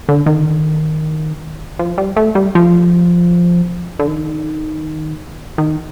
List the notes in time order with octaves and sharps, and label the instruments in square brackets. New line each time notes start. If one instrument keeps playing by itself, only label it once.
[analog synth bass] D3
D#3
F3
G3
A3
G3
F3
D3
D#3
D#3